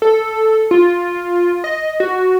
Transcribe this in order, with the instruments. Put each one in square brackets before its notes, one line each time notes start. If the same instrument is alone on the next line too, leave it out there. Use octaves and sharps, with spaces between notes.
[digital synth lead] A4
F4
D#5
F#4